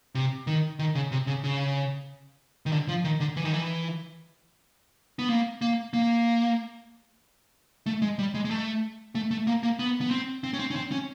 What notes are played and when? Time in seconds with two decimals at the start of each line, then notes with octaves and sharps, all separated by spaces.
0.15 C3
0.47 D#3
0.79 D#3
0.95 C#3
1.12 C3
1.27 C#3
1.44 C#3
2.66 D#3
2.72 D3
2.88 F3
3.04 D#3
3.20 D3
3.36 E3
3.45 D#3
3.54 E3
5.19 B3
5.29 A#3
5.62 A#3
5.93 A#3
7.86 A3
8.02 G#3
8.19 G3
8.34 G#3
8.45 G#3
8.51 A3
9.15 A3
9.31 A3
9.47 A#3
9.63 A#3
9.79 B3
10.01 B3
10.11 C4
10.44 C4
10.53 C#4
10.59 C4
10.71 C#4
10.76 C4
10.91 C#4